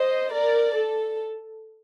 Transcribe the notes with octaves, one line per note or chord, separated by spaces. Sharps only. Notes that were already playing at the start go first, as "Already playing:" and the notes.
Already playing: C5 D#5
A#4 D5
A4